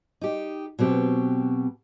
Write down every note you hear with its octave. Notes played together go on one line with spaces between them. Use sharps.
D#4 G4
B2 F#3 C4 G4